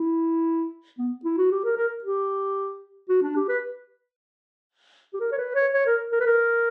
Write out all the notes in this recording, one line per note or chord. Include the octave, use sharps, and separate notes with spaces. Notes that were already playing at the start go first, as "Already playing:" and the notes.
Already playing: E4
B3
E4
F#4
G4
A#4
A#4
G4
F#4
D4
G4
B4
G4
A#4
C#5
B4
C#5
C#5
A#4
A#4
B4
A#4